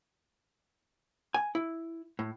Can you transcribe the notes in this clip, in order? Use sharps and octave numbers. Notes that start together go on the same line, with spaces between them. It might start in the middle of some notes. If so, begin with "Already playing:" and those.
G#5
E4
A2